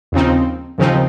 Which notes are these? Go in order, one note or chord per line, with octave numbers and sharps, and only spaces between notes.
D#2 C#3 F3 C4 D#4
D#2 C#3 F3 C4 D#4